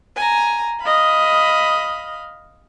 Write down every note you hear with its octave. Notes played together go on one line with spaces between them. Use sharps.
G#5 A#5
D#5 F5 B5